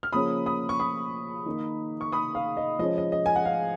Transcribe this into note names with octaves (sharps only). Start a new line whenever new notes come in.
F6
C#3 F3 A#3 C#4 B5 D#6
B5 D#6
C#6
B5 D#6
D#3 A#3 D#4
C#6
B5 D#6
F5
D#5
F3 G#3 C#4 D#5
D#5
D#5
G#5
F#5
F5